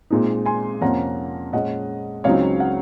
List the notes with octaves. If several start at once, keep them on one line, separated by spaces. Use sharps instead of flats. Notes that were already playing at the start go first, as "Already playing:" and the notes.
A#2 G#3 C4 D#4
G#5 C6
F2 C3 F3 A#3 C#4 F#5 A#5
A#2 G#3 C#4 D#5 F#5
C#2 C#3 F#3 C4 D#4 C#5 F5
F#5